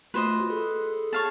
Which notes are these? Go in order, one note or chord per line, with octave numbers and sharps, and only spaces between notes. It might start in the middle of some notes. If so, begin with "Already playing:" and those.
A3 F4 F#4 B4 C5 D#5
G#4 A4
C#5 F5 A5